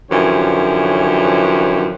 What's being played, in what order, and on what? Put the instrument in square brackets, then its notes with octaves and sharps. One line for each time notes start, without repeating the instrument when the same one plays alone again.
[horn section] F#2 D3 E3 F3 G4 C#5